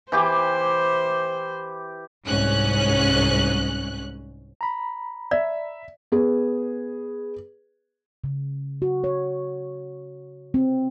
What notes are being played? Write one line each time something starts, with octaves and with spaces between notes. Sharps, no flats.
E3 G4 C5 D6
C2 G#2 C#4 F#6
A#5 B5
D5 E5
B3 G#4 B4
C#3
F#4
C#5
C4